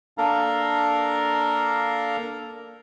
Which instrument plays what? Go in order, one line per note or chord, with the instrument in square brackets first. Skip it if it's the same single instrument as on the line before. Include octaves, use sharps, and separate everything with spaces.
[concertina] A#3 D4 A4 A#4 F5 A#5